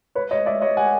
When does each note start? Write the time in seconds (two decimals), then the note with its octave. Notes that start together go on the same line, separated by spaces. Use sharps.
0.15 B4 C#5
0.31 C#5 D#5
0.46 D5 E5
0.62 C#5 D#5
0.77 F#5 G#5